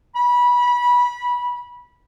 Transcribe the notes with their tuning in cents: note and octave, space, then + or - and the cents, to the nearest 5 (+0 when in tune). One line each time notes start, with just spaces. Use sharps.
B5 -20